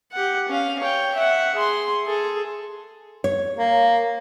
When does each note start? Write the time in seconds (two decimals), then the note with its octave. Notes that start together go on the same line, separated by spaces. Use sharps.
0.12 G4 F#5
0.48 C#4 F5
0.80 C#5 G5
1.15 E5 F#5
1.55 G#4 C6
2.06 G#4 A4
3.24 C#5
3.57 A#3